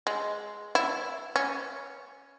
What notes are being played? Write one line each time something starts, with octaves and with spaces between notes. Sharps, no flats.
G#3
E4
C#4